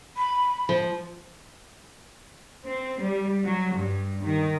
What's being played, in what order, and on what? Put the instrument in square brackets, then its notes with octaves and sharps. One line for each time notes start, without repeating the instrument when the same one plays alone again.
[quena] B5
[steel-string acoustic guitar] F3
[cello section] C4
G3
F#3
G2
D#3